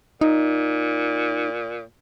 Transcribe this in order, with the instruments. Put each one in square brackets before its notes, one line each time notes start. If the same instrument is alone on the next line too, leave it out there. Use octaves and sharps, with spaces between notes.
[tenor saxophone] A#2 [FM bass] D#4